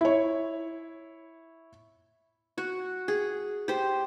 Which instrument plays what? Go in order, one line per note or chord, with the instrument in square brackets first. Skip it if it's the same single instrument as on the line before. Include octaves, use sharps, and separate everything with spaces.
[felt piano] E4 C#5
[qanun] F#4
G#4
G4 C5